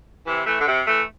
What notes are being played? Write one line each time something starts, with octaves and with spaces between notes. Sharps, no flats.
C3 E3
E3 A3
D3
C3
E3 A3